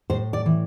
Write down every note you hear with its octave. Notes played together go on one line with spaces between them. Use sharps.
A2 C5
D5
E3